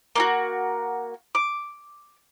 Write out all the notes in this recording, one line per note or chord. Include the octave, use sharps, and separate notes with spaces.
A#3 F4 F#4
D6